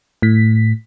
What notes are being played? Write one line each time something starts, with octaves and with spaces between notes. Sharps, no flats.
A2 B6